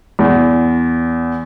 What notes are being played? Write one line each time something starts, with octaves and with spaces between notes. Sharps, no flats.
E2